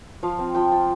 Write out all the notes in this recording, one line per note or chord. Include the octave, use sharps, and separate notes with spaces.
F3 F5
C4
F3 G5
F4